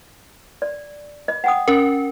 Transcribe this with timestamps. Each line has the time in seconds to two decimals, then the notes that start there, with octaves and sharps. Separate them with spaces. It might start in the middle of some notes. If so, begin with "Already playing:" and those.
0.62 D5
1.28 D#5
1.44 F#5 G5 D#6
1.68 C#4 A#4